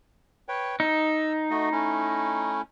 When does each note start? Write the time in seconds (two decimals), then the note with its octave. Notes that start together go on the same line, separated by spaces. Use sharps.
0.49 B4 C#5 G5
0.80 D#4 E6
1.50 A3 F#4 D#5
1.72 A3 C#4 E4